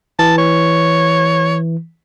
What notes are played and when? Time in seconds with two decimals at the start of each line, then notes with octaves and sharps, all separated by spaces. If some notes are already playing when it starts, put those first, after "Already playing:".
0.19 E3 A5
0.38 C#5